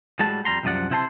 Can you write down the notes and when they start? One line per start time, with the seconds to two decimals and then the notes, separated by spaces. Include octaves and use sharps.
0.19 A2 G3 G#3 F#4 A5
0.45 F2 G3 A#5 C6
0.63 C2 F#2 C3 F3 D5 F#5
0.90 C3 E4 C5 E5 A5 C6